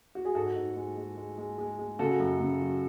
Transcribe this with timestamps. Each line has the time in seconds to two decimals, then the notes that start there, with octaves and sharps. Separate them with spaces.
0.15 F#4
0.25 G#4
0.35 G#2 F#4 A4
0.56 G#2
0.76 G#3
0.97 G#3
1.17 G#3
1.38 G#3
1.58 G#3
1.79 G#3
1.99 C#3 F#4 A4
2.19 F#2
2.41 C#3
2.61 F#3